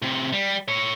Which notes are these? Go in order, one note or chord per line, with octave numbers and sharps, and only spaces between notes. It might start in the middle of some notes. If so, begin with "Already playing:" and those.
A2 C3
G3
A4 C#5